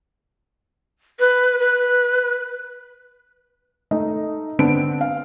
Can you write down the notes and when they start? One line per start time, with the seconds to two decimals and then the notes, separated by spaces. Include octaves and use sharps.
1.20 B4
1.59 B4
3.91 A3 D#4 D#5
4.59 D3 B3 C4 D4 D7
5.01 F5